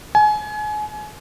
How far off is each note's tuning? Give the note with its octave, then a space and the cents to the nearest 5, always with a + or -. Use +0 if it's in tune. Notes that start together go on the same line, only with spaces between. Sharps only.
G#5 +30